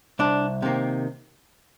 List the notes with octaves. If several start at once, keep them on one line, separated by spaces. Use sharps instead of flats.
C2 D4
C3 D#3 A#3